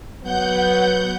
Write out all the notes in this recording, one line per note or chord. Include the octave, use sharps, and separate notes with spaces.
F#3 B3 F#5 G6